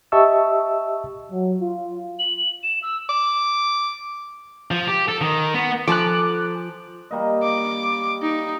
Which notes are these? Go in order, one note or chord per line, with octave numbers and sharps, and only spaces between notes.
G4 D#5 E5 A5 C#6 E6
F#3
F4
F#7
E7
E6
D6
F3
G4
A4
D#3
B3
F3 A4 G#5 A#5 D6 F#6
G3 A#3 D#5
D6
D#4